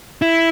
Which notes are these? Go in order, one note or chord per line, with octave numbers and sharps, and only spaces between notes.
E4